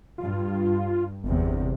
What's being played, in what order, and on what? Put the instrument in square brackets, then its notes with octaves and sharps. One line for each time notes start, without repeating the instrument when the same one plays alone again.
[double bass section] G2 [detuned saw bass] F4
[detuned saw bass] G1 [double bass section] E2 C3